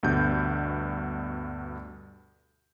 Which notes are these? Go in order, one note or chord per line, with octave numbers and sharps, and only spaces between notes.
D2 G2 B2 G6